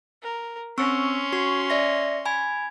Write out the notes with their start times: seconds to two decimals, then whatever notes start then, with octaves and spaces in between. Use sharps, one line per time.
0.23 A#4
0.78 C4 C#4 C6 C#6 E6
1.33 F#4 C#6
1.70 D5 E5 A#6
2.25 G#5 B5 G#6